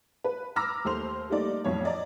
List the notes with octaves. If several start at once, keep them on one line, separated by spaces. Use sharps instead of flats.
B4
A#5 B5 D6 E6 F6 A#6
D#2 A3 C5 C6 F7
G3 A3 A#3 D#4 D5
B1 F2 A2 C#5
D5 D#5 A#5